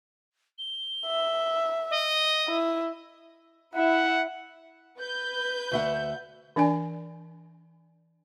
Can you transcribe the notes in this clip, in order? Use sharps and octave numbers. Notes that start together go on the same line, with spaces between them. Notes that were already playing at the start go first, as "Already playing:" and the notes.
G7
E5
D#5
E4
E4 F#5
B4 G6
D2 E5 F#5
E3 D4 D5 G#5